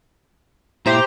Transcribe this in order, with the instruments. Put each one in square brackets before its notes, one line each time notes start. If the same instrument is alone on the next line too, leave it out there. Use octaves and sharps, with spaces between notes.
[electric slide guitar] A#2 E4 E5 [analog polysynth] G4 C5 A#5